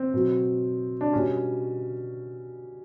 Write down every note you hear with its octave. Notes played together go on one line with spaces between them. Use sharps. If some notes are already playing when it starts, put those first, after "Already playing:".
Already playing: C4
B2 F#3
D4
B2 G3 C#4